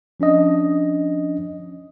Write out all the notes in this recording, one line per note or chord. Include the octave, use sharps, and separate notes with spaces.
F3 C#4 D4 D#5